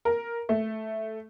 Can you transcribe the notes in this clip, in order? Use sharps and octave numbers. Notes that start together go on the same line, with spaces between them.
A#4
A3